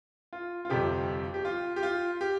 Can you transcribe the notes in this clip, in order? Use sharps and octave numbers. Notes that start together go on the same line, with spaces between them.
F4
F4
G1 F2 C3 F3 G4
G4
F4
G4
F4
G4